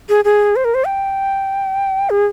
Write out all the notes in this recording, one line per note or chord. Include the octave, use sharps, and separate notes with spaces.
G#4
G#4
C5
A#4
C5
G5
G#4